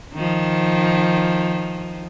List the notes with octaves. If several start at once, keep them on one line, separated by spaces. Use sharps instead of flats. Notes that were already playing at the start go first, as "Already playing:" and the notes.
D#3 F3